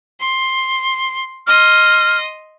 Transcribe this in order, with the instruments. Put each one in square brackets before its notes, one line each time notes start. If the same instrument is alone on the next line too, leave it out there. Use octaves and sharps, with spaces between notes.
[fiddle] C6
[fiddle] D#5 C6 [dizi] F6